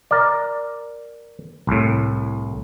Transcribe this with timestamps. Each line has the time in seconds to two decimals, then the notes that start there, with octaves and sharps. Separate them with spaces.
0.11 A#4 D5
1.67 C2 A2